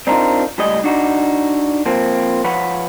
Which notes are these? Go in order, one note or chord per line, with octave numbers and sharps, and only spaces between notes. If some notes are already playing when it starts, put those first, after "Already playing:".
C4 D4 D#4 F4 A#4
C#2 A2 G3 D#5
D4 D#4 F#4
F3 A#3 C4
F3 B4 C#5 F#5